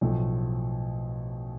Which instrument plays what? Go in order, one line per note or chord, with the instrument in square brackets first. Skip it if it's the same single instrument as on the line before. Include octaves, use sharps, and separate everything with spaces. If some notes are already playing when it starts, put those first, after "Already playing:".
[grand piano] B1 A2 F3 A3